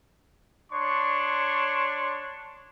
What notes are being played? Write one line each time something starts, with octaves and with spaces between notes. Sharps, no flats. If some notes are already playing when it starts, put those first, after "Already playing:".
D4 C#5 C6 C#6